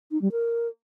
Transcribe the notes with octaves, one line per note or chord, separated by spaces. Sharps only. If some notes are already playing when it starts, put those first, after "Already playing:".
D#4
G3
A#4